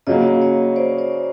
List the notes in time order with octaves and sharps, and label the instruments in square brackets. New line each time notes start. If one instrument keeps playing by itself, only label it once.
[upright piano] C#3 F#3 A#3 [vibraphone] C#5 D#5
[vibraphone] C#5 D#5
C5 D5
C5 D5